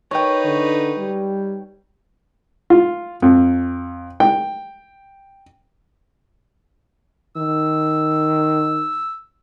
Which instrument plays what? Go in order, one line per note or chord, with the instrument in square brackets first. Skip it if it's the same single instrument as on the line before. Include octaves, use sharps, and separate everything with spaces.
[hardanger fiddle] D#4 B4 [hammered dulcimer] C#5 G5
[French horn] D3
G3
[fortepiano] F4
F2
G5
[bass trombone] D#3 [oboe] E6